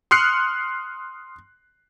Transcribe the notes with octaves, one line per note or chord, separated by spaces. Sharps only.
C6 D#6 F6 F#6 C7 C#7